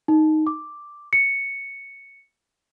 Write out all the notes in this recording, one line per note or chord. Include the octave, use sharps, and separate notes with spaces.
D#4
D6
C#7